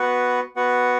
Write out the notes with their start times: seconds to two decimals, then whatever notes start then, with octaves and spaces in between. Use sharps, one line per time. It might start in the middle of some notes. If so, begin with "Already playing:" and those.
Already playing: B3 F#4 B4 F#5
0.56 B3 F#4 B4 F#5